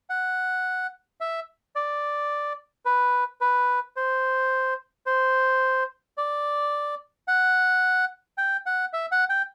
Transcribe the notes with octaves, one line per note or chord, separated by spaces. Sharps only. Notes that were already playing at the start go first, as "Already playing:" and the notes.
F#5
E5
D5
B4
B4
C5
C5
D5
F#5
G5
F#5
E5
F#5
G5